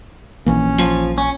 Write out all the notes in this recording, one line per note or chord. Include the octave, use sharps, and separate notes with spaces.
A#1 E3 A#3 C#4
F3
C#4